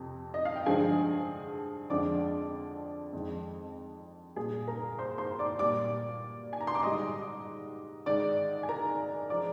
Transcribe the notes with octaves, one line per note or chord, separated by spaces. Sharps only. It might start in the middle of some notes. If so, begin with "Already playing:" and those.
Already playing: F2 C3
D#5
F5
G5
G2 D3 F3 G#3 G#4 G#5
F2 D3 F3 G#3 D5 D6
F2 D#3 G#3
A#2 G3 G#4 G#5
A#4 A#5
C5 C6
C5 C6
D5 D6
A#2 G3 D5 D6
G#5
A#5
C6
D6
G#2 G3 D#5 D#6
G#2 D#3 G#3 D5 D6
G#5
A#4 A#5
F3 G#3 D5 D6